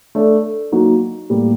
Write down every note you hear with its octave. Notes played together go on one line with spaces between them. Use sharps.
A3 D4 A4 D5
F#3 A#3 D#4 F#4
A2 G3 A#3